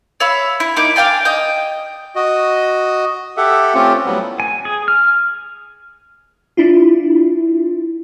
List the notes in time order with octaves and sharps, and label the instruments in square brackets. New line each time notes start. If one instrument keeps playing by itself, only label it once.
[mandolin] C#5 E5 F5 B5
E4
A#3 D#4 D6
D4 F5 G5 G#5
D#5 G5
[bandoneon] F#4 D#5
G4 A4 E5 F#5
A3 C4 C#4 F4 G4
A2 F#3 G3 B3
[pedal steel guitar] G#5
G#4
F6
[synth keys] D4 E4 F4